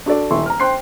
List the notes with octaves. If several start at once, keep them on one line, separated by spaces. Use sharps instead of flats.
D4 F#4 A4 D5
D#1 E4 C6 C#6
A#5 F6
C5 G5 C6 F#6 C7